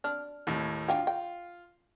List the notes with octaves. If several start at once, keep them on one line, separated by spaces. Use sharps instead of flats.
D4 F6
D#2 A2
D4 F4 G5 G#5
G5